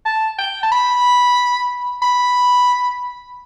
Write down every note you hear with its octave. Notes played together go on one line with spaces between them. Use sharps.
A5
G5
A5
B5
B5